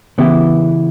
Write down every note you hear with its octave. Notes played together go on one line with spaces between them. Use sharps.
C#3 E3 B3 E4 G4